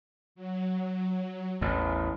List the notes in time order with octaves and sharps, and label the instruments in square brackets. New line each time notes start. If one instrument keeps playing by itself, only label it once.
[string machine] F#3
[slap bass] A1 E2